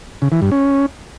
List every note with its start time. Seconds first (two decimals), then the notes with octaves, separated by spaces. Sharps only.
0.22 C#3
0.32 E3
0.42 G2
0.52 C#4